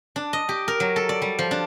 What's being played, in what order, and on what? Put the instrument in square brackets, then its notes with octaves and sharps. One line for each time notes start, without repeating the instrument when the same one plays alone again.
[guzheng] D4
D#5
G4
A#4
F#3
A4
D5
G3
F3
D4